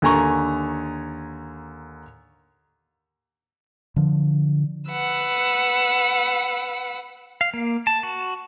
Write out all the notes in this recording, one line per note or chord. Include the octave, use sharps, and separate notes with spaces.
D#2 D3 G#5 A#5 C#6
D3 F3
B4 F#5 E6
F5
A#3
A5
F#4